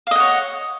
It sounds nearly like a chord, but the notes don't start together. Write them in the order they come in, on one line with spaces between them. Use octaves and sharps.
F5 D#5 F#5 C#5